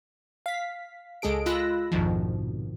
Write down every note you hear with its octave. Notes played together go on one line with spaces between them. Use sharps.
F5 B6
C#2 G#3 G#4 A4 D7
G#3 F4 B5 E6 F#6 A#6
A#1 F2 G#2 B2 D#3 F3